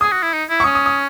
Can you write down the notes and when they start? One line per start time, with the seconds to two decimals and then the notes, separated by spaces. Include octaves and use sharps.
0.01 G#4 D#6
0.12 F#4
0.23 E4
0.33 D#4
0.49 E4
0.60 C#6
0.64 C#4 D#6
0.75 D#6
0.86 D#6